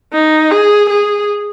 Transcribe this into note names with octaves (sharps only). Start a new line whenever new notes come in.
D#4
G#4
G#4